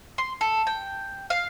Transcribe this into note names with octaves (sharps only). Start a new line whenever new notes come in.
C6
A4
G5
F5